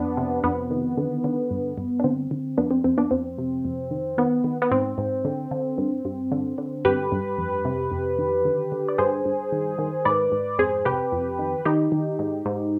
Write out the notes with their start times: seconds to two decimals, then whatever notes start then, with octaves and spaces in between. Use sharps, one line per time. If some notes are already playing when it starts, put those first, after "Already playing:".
Already playing: F2 B3 D4
0.17 C3
0.44 F2 B3
0.71 D#3
0.97 D3
1.24 D3
1.51 G2
1.78 G2
2.00 D4
2.04 D3 C4
2.31 D3
2.57 F2 B3 D4
2.71 C4
2.84 F2 C4
2.98 B3 D4
3.11 F2 C4
3.38 C3
3.65 F2
3.91 D#3
4.18 D#3 B3
4.44 D#3
4.62 B3
4.71 G#2 C4
4.98 G#2
5.25 D3
5.51 D3
5.78 G2
6.05 G2
6.32 D3
6.58 D3
6.85 G2 G4 B4
7.12 G2
7.38 F2
7.65 C3
7.92 F2
8.18 D#3
8.45 D3
8.72 D3
8.88 D5
8.98 G2 G#4 C5
9.25 G2
9.52 D#3
9.78 D#3
10.05 G#2 B4 D5
10.32 G#2
10.59 F2 G#4 C5
10.85 C3 G4 B4
11.12 F2
11.39 D#3
11.65 D#3 D#4 G4
11.92 D#3
12.19 G#2
12.46 G#2